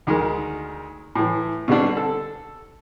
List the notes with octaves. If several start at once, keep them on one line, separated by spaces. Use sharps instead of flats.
D2 D#3 G#3 A#4
A2 E3
B2 D3 G3 C4 D4
A4